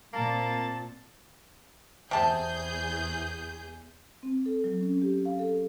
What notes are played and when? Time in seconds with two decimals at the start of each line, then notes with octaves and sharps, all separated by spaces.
0.13 A#2 A#3 C4 A5
2.11 E2 C3 G#4 A5 G6
4.23 C4
4.46 A4
4.64 F#3
4.81 C#4
5.02 G4
5.25 F5
5.39 A4